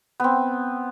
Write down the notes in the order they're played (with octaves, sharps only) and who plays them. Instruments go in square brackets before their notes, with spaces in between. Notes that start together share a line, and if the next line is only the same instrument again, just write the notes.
[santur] B3 C4